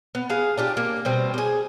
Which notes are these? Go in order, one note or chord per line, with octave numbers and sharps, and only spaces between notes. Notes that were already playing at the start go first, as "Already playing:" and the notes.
B3
G#4 F5
D4 F4 G4
A#3
B2 G3 C4
G4 G#4